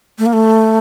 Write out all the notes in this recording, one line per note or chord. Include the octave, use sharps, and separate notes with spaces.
A3
A#3
A3